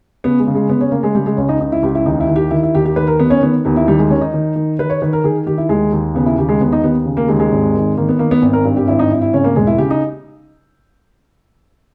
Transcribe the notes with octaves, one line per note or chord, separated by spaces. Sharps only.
C#3 B3
G#3
C#3
G#3
C#3 B3
C#4
C#3 A#3
G#3
C#3 G3
G#3
C#2 C#4
D#4
C#2 D#4
E4
C#2 G4
E4
D#2 D#4
E4
D#3
G4
D#3 E4
E4
D#2 G4
G4
D#3 B4
A#4
D#3 B3
C#4
D#3 B3
D#2 B3
E4
D#3 G3
G#3
D#3 C#4
D#4
D#3
D#3
D#3 B4
C#5
D#3 B4
A#4
D#3 G#4
D#3 G4
E4
D#2 G#3
D#2
C#3 B3
E4
D#2 G4
G#3
D#2 B3
D#4
D#2 B3
C#3
A#3
D#2 G#3
G#3
G#1
D#3
D#3 A#3
B3
D#3 A#3
B3
G#1
A#4
G2
G4
G#1 E4
D#4
G#1 E4
E4
C#3 C#4
A#3
E1 G#3
E4
C#3 G4
D#4